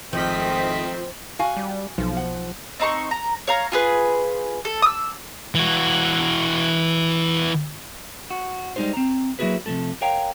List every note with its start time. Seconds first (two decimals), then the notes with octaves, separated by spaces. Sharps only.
0.13 G#1 D#3 F3 A3 C4 D#5 B6
1.39 F#4 F5 G#5
1.57 G3
1.98 B1 F3
2.17 F#5
2.80 C4 D#4 A#5 C#6
3.11 A#5
3.47 C#5 F5 A#5
3.72 F4 G#4 B4
4.65 A4
4.82 D#6 E6
5.55 E3 F#4
8.31 F#4
8.76 G3 G#3 D#4 F#4 C5
8.93 C4 A#5
9.39 F#3 A#3 E4 F#4 G#4 B4
9.66 C3 E3 F3 A3 A4
10.01 A#4 C#5 F5 G5 G#5 A#5